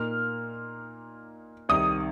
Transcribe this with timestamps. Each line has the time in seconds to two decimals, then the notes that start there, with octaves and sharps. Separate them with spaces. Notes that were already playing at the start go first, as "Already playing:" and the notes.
Already playing: A#2 A#3 D#4 F6
1.69 C2 C3 D#3 D#6